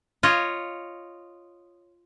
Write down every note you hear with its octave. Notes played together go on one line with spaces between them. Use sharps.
F4 C#5 D#5